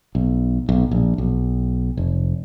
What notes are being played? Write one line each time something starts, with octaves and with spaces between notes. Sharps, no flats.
B1
B1
A#1
B1
F1